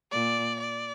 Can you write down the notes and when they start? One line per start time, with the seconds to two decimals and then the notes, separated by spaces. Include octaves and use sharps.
0.12 A#2 D5
0.60 D5